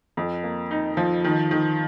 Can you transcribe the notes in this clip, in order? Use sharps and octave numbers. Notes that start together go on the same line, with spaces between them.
F2
A#3
D#4
F3
D#3
D#3